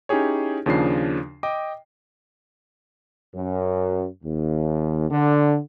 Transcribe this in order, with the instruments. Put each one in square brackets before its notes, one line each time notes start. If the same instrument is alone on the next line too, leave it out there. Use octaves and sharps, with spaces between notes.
[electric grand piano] C#4 D#4 E4 G4 G#4 C#5
D#2 C#3 F3 D4 C7
D#5 G5 D6
[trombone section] F#2
D#2
D3